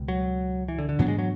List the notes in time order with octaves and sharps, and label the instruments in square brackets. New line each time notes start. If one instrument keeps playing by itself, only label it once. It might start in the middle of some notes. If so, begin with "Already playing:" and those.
Already playing: [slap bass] C#2 B2 G#3
[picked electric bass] F#3
E3
D3
D3
[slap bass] G#2 E3 B3 D4 [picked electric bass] F#3
[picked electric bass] G#3
F#3